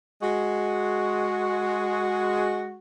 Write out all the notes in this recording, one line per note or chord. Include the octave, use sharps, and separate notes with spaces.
G#3 F#4